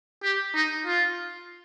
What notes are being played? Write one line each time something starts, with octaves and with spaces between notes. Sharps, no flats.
G4
D#4
F4